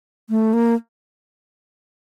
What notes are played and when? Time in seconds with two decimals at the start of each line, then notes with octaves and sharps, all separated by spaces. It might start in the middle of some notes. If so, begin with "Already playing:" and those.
0.30 A3
0.53 A#3